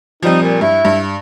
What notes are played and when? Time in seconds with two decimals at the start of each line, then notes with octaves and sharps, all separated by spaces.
0.23 F3 G3 C4 D#4
0.42 A#2
0.61 G2 E4
0.85 G2